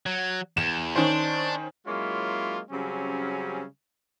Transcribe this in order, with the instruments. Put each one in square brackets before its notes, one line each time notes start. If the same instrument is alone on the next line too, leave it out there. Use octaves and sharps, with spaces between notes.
[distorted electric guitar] F#3
[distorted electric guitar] E2 [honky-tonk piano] E7
[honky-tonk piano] D#3 C#4 C5 [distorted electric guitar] D4
[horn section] F#3 G#3 A#3 C#4 E4 F4
C#3 F#3 G3 C4 C#4